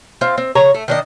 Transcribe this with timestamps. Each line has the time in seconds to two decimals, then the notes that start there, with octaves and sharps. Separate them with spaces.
0.21 C4 F4
0.38 C4
0.55 C#3 C#5 A#5
0.75 A3
0.88 D#3 D4 D#5